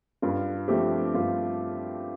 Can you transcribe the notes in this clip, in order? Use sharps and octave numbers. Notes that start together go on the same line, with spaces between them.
G2 F4
F3 A3 C4 G4
G2 F4